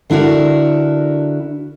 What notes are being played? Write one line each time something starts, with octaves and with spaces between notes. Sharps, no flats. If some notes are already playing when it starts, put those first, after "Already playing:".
D3 D4 E4 F#4 A#4